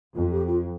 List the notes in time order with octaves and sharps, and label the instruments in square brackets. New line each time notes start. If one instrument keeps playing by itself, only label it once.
[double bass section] F2 [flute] F4
[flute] G4
F4